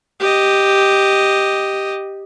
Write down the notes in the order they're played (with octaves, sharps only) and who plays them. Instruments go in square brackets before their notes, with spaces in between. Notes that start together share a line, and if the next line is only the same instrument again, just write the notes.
[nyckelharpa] G4 D#5